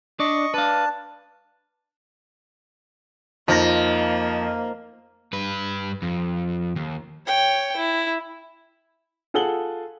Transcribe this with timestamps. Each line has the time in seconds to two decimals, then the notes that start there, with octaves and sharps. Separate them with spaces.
0.19 D4 D5 D#5 C#6
0.54 D4 B4 F5 A5
3.48 F2 F3 A#3 D#4 A5 A#6
5.33 G2 B4
6.02 F2
6.76 D#2
7.26 C#5 G5
7.77 E4
9.34 F4 G#4 A4 F#5 F#7 G7